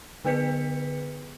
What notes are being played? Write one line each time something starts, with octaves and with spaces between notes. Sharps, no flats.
D3 B3 G#4 B4 B6 C#7